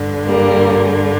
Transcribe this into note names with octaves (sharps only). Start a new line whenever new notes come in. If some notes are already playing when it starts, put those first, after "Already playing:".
Already playing: G2 D3
G3 A#3